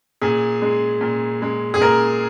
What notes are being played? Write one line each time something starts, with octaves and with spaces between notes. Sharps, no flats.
A#2 G#4
G#3
A#2
G#3
G#4
A#2 A#4